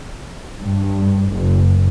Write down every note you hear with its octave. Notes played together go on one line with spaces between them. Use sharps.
G2
F#1